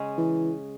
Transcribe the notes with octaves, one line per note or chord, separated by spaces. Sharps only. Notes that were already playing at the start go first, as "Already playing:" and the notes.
Already playing: C#3 G#3 C#4
E3